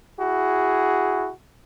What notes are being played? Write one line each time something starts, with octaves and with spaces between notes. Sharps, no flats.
E4 F#4 G#4